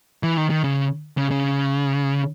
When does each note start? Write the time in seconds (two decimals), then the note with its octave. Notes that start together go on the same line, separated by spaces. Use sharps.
0.23 E3
0.37 D#3
0.50 D#3
0.64 C#3
1.18 C#3
1.31 C#3